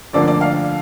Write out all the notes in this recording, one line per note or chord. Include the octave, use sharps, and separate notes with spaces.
D2 D3 F3 A#3 D4 D5
D5
F5